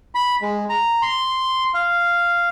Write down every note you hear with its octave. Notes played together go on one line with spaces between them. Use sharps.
B5
G#3
A#5
C6
F5